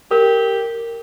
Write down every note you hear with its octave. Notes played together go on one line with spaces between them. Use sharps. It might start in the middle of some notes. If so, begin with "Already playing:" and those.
G4 A#4